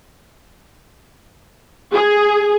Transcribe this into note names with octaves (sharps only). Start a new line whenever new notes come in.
G#4